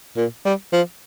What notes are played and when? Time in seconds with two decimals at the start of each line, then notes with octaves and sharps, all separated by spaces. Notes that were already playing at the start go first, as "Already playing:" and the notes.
0.17 A#2
0.45 G3
0.73 F3